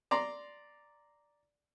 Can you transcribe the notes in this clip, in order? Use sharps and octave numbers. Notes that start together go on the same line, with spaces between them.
D5 A#5 C6